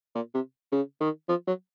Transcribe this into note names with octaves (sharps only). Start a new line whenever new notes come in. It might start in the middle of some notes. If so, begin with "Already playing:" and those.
A#2
C3
C#3
D#3
F3
F#3